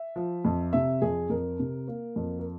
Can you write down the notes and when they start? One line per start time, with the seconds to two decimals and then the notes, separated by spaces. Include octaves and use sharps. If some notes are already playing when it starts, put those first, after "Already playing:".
Already playing: E5
0.16 F3
0.45 F2
0.73 C3 E5
1.02 F2 G#4
1.30 F2 A#4
1.59 C3
1.88 A#3
2.16 F2
2.39 A#4